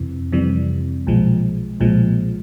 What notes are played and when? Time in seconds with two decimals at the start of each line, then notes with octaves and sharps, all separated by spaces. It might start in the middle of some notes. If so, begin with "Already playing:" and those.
Already playing: F2 C3 E3
0.32 F2 C3 E3 G3
1.07 B1 A#2 F3 G#3
1.80 B1 A#2 F3 G#3